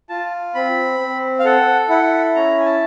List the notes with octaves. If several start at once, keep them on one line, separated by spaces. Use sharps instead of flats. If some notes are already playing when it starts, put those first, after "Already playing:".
F4 A5
C4 B5
C4
F5
A4 F#5
E4 F#5
C#4 A#5
G#5
A5